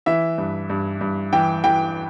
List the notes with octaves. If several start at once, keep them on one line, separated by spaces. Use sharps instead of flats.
E3 E5
G2
G2
G2
E3 G5
E3 G5